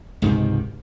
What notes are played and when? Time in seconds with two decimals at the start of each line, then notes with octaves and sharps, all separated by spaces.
0.22 C#2 G#2 C3 D#3